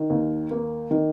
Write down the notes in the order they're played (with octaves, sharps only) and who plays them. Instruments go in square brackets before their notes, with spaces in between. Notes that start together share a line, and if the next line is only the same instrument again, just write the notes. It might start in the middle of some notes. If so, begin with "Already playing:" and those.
Already playing: [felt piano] D#3
D#2
A#3
D#3